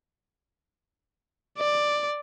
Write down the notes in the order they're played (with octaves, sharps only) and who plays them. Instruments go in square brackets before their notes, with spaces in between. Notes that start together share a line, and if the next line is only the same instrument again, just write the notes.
[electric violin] D5